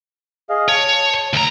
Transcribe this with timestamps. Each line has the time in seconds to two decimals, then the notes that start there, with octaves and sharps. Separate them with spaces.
0.50 G#4 D#5 F5
0.68 C#5 A5
1.33 D2 A#5